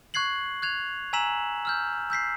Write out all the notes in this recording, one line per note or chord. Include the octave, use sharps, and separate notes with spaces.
C#6 F#6 G#6 C7 F#7
F#6 G#6 F7
G#5 A#5 E6 B6 E7 F#7
E6 F6 G6
E6 G6 B6 C7